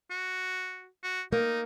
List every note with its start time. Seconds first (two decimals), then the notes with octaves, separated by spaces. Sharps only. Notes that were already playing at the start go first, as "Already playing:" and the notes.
0.11 F#4
1.03 F#4
1.33 A#3 D#4